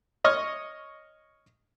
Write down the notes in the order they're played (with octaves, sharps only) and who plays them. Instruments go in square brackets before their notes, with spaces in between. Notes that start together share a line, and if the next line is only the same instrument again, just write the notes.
[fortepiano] C#5 D#5 C#6 F6